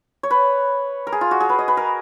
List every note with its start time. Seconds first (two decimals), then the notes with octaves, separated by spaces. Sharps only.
0.23 C#5
0.31 B4
1.07 A#4
1.12 G#4
1.21 F4
1.31 F#4
1.40 G#4
1.49 B4
1.59 D#5
1.68 B4
1.77 A#4